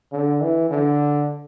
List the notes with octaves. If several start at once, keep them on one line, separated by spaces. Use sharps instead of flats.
D3
E3
D3